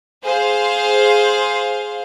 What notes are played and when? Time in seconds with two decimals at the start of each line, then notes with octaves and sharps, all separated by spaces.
0.23 G#4 C5 F5